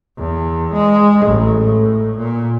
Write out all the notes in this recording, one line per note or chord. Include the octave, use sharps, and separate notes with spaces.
E2
G#3
A1
A2
A#2